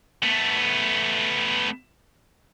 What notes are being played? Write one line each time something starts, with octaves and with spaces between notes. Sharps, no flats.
A3 B3